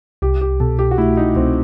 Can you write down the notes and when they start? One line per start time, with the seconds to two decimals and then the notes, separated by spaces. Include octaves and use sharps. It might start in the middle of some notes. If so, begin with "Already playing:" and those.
0.22 C2 G4
0.41 G4
0.60 B2 A4
0.79 G4
0.91 F#4
0.98 A3 E4
1.17 D#4
1.36 C2 C4